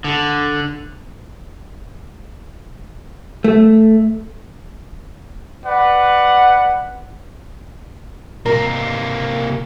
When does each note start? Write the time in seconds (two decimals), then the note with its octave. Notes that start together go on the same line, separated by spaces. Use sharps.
0.04 D3
3.44 A3
5.64 B4 D5 F#5
8.46 C3 A#3 A#4